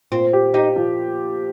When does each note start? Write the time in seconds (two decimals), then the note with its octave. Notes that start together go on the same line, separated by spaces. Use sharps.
0.12 A#2 C4
0.33 G4
0.54 D#4 G4
0.76 F3